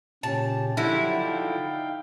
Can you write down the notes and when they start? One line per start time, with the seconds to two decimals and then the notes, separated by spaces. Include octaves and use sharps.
0.23 A#2 C#3 C#4 G4 A5
0.77 D3 F3 F#3 E4 G4 F#5 A#6
1.23 D#4 F5 G5